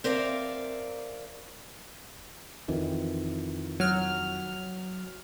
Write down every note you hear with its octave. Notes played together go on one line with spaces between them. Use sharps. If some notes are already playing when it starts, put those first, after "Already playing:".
C4 A#4 D5 E5 F5
F2 D#3 E3
F#3 F6